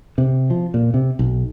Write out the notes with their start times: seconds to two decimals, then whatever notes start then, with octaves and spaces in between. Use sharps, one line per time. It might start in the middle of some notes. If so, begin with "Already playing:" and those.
0.18 C3
0.50 F3
0.74 A#2
0.94 C3
1.19 B1